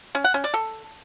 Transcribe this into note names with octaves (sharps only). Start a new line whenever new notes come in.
C#4
F#5
C#4
D5
A4